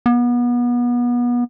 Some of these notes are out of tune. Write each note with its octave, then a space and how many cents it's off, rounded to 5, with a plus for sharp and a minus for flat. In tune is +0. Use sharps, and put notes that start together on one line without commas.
B3 -30